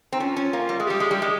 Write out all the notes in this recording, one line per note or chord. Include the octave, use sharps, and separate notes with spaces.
C4 D#4
C#4 F4
C#4
A#3
G3
G#3
G3 G4
G#3
G3
G#3